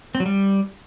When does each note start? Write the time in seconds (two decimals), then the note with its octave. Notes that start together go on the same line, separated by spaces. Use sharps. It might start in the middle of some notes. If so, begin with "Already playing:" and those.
0.15 C4
0.20 F#3
0.26 G3